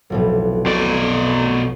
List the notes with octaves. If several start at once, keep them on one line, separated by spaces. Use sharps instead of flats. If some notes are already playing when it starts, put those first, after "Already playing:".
F1 B1 A2
B2 D5